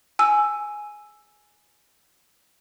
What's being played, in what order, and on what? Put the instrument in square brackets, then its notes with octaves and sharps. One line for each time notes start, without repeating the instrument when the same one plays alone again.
[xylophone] G#5 E6